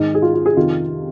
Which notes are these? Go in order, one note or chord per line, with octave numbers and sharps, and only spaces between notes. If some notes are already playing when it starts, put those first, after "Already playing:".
Already playing: G#2 D#3 D#4
G#4
F4
F4
G#4
F2 C3 D#3 F4